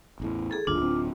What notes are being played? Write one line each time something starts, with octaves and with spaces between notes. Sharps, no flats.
A1 E2 A2
G#4 A4
D1 G1 D#2 D4 F4
D1 C4